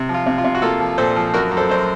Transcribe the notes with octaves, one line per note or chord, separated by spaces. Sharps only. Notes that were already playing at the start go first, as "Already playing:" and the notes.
Already playing: C3
F3
F4
C3
F4
C3
F#4
A#3 F4 A4
F3
A#2 A4 C5
F3
F#2 F#4 A#4
F#2
A4 C5
F#2 C5